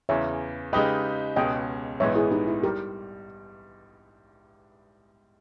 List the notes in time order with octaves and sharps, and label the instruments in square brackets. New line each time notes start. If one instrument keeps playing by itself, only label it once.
[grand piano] E2 C#3 E3 [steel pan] C#5 E5
[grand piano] C#3 G#3 D#4 G4 B4 [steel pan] D#5 G5
[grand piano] C#2 B2 G#3 C#4 [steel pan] D#5 G5
[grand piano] A#1 G#2 E3 G#3 B3 [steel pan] C#5 E5
[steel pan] E4 G#4
D#4 G4
E4
[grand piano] G3 [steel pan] G4 A#4